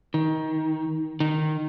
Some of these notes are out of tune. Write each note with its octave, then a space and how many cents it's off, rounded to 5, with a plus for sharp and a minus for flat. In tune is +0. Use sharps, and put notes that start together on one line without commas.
D#3 +20
D#3 -10